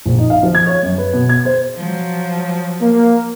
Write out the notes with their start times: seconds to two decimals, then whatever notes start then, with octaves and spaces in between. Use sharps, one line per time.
0.06 A#1
0.18 D#4
0.30 F5
0.43 F3
0.55 G#6
0.66 C#5
0.83 F#2
0.98 B4
1.13 B2
1.29 G#6
1.45 C5
1.76 F3 F#3
2.81 A#3